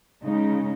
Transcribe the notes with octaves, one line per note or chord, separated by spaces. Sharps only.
C#3 G#3 D#4